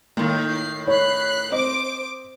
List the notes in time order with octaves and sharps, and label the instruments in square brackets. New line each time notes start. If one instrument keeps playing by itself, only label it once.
[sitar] A2 D#3 [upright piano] A#3
[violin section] C7
[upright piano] C#5 [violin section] B5 F#6 C7
[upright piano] C4 D#5 [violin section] C5 D6 D7